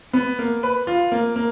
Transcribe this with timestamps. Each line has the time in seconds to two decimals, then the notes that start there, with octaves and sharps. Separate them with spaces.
0.13 B3
0.39 A#3
0.63 B4
0.87 F4
1.12 A#3
1.36 A#3